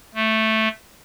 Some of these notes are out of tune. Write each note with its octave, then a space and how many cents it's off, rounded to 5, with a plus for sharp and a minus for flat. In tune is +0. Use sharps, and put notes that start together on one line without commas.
A3 +0